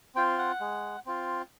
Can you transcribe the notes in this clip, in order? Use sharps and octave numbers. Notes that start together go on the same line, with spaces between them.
C4 F4 G5
F#5
G#3
C4 F4